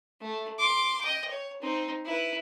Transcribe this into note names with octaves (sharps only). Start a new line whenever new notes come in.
A3
C6 D6
D#5 G5
C#5
C4 D#4
E4 B4